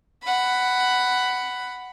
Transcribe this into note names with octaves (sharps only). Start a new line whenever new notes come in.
F#5 B5